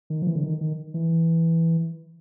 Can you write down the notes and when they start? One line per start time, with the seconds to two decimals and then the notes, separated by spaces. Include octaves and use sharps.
0.10 D#3
0.22 F3
0.27 E3
0.35 D3
0.44 D#3
0.61 D#3
0.94 E3